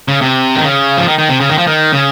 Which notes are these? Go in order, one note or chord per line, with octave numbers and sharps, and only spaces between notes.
C#3
C3
D#3
C#3
F3
D#3
D#3
C3
C#3
D#3
F3
D#3
C#3